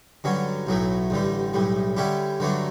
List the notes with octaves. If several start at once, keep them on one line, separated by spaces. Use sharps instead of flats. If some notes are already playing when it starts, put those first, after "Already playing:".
G2 D3 F#3 C#4
B1 A2 F#3 A3
A1 G2 D3 G3
B1 A2 G3
D3 G3 C#4 E4 G4
G2 D3 F#3 A3 D4